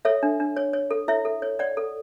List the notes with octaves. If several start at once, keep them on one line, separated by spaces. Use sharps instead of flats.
A4 C#5 E5
D4
D4
C#5
C#5
A4
E4 C#5 E5
A4
C#5
C#5 D5 F#5
A4